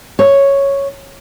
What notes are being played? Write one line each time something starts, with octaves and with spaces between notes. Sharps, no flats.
C#5